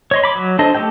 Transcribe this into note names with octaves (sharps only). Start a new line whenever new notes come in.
C#5 D#5 C6
B5 D6
F#3
D4 A4 C5 D#5
A3 G4 A4 D#5 G5